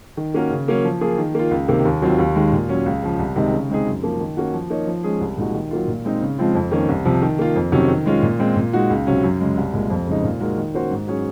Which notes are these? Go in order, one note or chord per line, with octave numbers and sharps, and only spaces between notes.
D#3
A#3 C#4 F#4 A#4
C#3
F#3 A#3 C#4
F3
A#3 F4 G#4
D#3
A#3 F4
C#2
C3 D#3 A#3
D#2
D#3 F#3 C4 F4
D#2
D#3 G#3
A#2
F#3 C#4
C#2
C#3 F3
C2
C3 D#3 G#3 D#4
C#3
G#3 C4 D#4 G#4
F#2
F3 A#3
D#3
A#3 C#4 F#4
F3
A#3 D#4 A#4 C#5
F3
G#3 C#4 G#4
C2
A#2 G#3 D#4 F#4
D#3
F#3 A#3 F4
A#2
G#3 C4 D#4
C#3
F3 G#3 C4 F4
F2
D#3 A#3 C#4
C2
C3 F3
D#3
A#3 F4
F2
C3 D#3 F#3 C#4
D#3
G#3 C#4 F4
A#2
G#3 C4
A#2
G#3 D#4 F#4
C#2
C3 F#3 C#4
F#2
C#3 G#3
C2
A#2 G#3
F2
C#3 G#3 D#4
A#2
G#3 D#4 F#4 A#4
D#3
A#3 C#4 F#4 C5
G#2
F#3 C#4 G#4 C#5